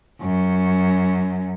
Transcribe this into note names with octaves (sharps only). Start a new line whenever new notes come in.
F#2